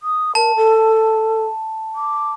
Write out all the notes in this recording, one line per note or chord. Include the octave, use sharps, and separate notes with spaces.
D#6
A#4 A5
A4
D6